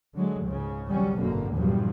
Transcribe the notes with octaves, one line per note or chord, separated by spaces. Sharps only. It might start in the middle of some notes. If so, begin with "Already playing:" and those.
D3 F#3 G#3
C#2 G#2 C#3
G#1 F#3 G3 C#4
G#1 F#2 B2 D3 A#3
E2 G2 A#2 C#3 F3 F#3